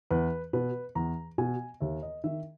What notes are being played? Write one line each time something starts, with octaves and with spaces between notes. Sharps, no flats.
E2 B4
B2 B4
E2 A#5
B2 G#5
D#2 E5
D#5
D#3 E5